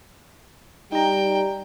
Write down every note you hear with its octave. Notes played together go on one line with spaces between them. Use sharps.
G3 D#4 G5 A#5